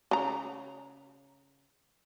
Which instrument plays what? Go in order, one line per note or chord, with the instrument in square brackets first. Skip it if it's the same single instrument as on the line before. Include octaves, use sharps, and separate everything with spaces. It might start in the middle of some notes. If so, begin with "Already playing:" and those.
[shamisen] C#3 A#5